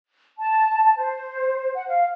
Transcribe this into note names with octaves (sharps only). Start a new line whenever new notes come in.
A5
C5
F#5
F5